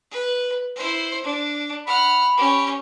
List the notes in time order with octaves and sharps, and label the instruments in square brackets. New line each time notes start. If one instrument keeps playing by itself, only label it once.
[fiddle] B4
E4 C5
D4
[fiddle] F#5 F6 [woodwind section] B5
[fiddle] C#4 G4